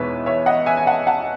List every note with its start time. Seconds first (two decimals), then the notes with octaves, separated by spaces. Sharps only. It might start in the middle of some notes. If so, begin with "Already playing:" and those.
Already playing: E2 B2 G#3 B3 D#4 B4 C#5 E5
0.26 C#5 E5
0.46 D#5 F#5
0.66 E5 G#5
0.77 G#5
0.86 F#5 A5
1.07 F#5 A5